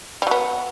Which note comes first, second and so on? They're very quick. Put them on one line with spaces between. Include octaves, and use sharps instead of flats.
G3 F#3 B3